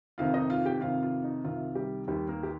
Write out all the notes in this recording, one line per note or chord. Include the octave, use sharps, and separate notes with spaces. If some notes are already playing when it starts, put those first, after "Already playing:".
F2 C3 D#3 F4 F5
D#4 D#5
F4 F5
G4 G5
F2 C3 D#3 F4 F5
F4
D#4
C2 C3 D#3 F4
G3 G4
D#2 D#3 G3 G4
A#3 A#4
G4